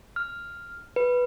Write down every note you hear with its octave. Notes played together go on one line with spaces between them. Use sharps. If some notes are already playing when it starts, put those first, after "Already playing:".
F6
B4